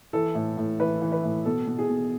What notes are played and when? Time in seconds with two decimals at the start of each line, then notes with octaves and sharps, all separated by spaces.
0.13 E3 A4
0.35 A2
0.57 A2
0.80 E3 B4
1.02 E3
1.12 B4
1.23 A2
1.45 B2 A4
1.67 B2
1.79 G#4
1.89 B2